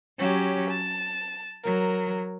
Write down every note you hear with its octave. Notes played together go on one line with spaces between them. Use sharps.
F#3 C#4 G4
A5
F#3 A#4